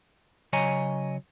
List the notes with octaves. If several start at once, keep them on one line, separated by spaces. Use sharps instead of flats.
C#3 F#3 C#5 D#5 G#5 A#5